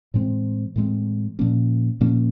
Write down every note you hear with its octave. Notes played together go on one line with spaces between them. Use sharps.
A2 E3 G#3 C4
A2 E3 G#3 C4
A#2 F3 A#3 C#4
A#2 F3 A#3 C#4